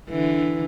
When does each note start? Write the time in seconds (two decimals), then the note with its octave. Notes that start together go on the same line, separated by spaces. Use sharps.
0.10 D3 E3